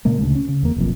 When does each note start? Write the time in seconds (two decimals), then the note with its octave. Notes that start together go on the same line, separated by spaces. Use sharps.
0.05 A#2 C#3 G#3 A#3
0.19 D2 C#3
0.35 C#4
0.49 C#3
0.63 E2 A#3
0.76 F1 B1 F2 A#2